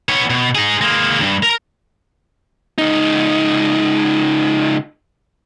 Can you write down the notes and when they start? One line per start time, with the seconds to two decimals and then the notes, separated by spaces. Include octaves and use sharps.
0.09 B3 C#5
0.30 B2
0.55 D#4 G#4
0.81 G#3 A#3
1.19 D2 G2
1.43 A#4 A#5
2.78 C#2 D#4